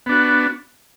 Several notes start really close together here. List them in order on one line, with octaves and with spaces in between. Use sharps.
B3 D4 F#4